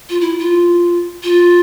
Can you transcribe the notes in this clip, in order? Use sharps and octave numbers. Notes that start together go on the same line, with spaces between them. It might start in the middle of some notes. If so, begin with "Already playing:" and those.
F4
E4
F4
F4